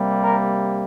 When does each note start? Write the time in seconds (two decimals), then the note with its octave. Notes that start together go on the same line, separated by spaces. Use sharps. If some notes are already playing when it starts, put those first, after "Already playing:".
Already playing: C3 G3 A#3
0.23 A#4